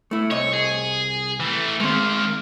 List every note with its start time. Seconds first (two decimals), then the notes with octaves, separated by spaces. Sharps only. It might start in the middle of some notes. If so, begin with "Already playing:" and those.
0.11 A3 E4
0.31 C2 C#5 D#5
0.53 G#4
1.40 E3 A3
1.80 D#3 G#3 A#3 C4